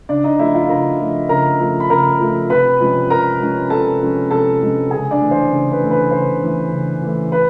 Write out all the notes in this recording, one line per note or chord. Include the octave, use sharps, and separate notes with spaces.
C#3 D4 D5
D#4 D#5
F3 A3 E4 E5
F4 F5
C#3 A#4 A#5
F3 A3
C#3 A#4 A#5
F3 A3
B5
C#3 A#4 A#5
F3 A3
C3 B4 B5
F3 G#3 C#4
C3 A#4 A#5
F3 G#3 C#4
C3 A4 A5
F3 G#3 C#4
C3 A4 A5
F3 G#3 C#4
C#3 G#4 G#5
D4 D5
E3 A3
C5
C#3
B4
E3 A3
B4
C#3 C5
E3 A3
C#3
E3 A3
B4